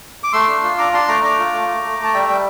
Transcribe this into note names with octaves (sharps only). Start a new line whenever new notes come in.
D6
A3 C6 E6
D4
F4
D4 A#5 D6
D4 A5 C6
A3 A#5 D6
D4 A#5 D6
F4
A3
A3
A3
A3
A5
G3 E5 G5
G3 G5